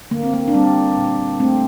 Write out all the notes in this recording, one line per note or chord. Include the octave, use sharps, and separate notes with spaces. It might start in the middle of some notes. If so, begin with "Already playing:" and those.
D3 A#3
C4
A#3
D4
G3 C4
A#2
A3 C4